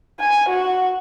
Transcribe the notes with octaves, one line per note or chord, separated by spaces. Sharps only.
G#5
F#4